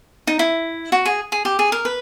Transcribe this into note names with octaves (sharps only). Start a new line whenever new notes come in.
D#4
E4
F#4
G#4
G#4
G4
G#4
A#4
B4